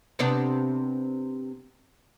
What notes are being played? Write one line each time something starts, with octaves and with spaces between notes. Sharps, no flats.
C3 B3 D4